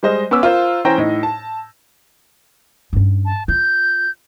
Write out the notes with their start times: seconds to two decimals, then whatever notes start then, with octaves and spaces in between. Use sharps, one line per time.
0.03 G3 G#3 C5 D#5
0.31 B3 C#4 B5 D6 E6
0.43 F4 A#4 C5
0.85 E3 C#4 C5 G5 A#5 A#6
0.98 A2 D#4
1.23 A5
2.93 G2 C#4
3.25 A5
3.48 F4 G6